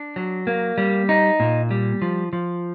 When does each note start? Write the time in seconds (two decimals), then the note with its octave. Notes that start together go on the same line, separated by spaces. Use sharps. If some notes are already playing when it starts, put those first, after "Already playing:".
Already playing: D4
0.16 F#3
0.47 A#3
0.78 G3
1.09 D#4
1.40 A#2
1.71 G3
2.02 F3
2.33 F3